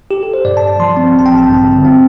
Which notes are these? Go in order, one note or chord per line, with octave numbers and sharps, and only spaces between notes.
G4
A4
C5
G2 D5
A5
G2
A5
F3 C6
C4
A1 A5
G5
A1
A5
G2
D3
C4